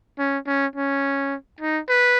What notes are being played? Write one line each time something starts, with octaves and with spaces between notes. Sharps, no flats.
C#4
C#4
C#4
D#4
B4